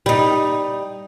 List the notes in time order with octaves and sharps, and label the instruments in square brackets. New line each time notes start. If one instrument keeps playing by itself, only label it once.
[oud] G3 D#4